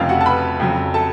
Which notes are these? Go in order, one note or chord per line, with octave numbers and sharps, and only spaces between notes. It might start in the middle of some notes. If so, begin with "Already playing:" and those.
Already playing: F1 F2 C#3 F4 F5
F#4 F#5
A5
B4 B5
F2 C#3 F#3
A4 A5